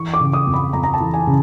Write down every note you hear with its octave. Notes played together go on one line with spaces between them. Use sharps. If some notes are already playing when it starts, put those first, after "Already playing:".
Already playing: E3 C#6
D6
C#3
D#6
F2
B5
F2 A#5
A#5
A5
E3
G#5
C#3